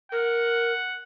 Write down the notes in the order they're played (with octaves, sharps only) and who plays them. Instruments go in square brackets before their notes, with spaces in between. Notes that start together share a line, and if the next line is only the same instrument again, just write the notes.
[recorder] A#4 [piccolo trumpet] F#5